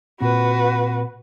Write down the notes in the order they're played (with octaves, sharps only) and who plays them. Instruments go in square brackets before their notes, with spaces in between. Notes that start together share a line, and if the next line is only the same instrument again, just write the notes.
[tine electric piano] A#2 C4 [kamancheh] F#4 B4